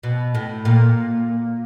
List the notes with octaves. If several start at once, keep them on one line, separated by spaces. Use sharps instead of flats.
B2
A2
A#2